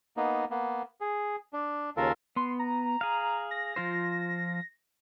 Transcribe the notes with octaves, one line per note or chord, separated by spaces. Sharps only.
A#3 B3 D#4
A#3 B3
G#4
D4
D#2 C#3 F4 A4 A#4
B3 C6
A#5
G#4 F5
A#6
F3 F4 C5